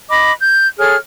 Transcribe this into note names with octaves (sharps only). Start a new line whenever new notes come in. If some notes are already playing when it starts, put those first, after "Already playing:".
D#5 B5 D6
G6
G#4 A4 C#5 F6